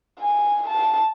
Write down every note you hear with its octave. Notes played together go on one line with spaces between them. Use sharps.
G#5
A5